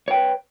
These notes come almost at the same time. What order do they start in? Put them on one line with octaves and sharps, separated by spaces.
C#5 G5 B4